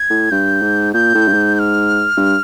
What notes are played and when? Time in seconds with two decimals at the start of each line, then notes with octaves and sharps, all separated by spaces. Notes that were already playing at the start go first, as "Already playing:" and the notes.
Already playing: G#6
0.10 A2
0.31 G2 G6
0.62 G#2
0.94 A#2 G6
1.14 A2
1.28 G2
1.34 G#2
1.55 G6
1.59 F6
2.17 G2